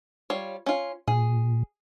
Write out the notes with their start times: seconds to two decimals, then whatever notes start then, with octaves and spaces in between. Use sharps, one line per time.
0.30 G3 F4 C#5
0.66 C#4 F4
1.08 A#2 G#4